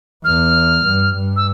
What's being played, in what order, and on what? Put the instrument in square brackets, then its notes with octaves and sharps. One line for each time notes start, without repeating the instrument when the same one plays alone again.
[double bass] E2 [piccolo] F6
[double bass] G2
G2
[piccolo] E6